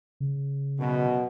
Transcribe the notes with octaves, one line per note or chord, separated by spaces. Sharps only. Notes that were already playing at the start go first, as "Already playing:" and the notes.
C#3
F#2 B2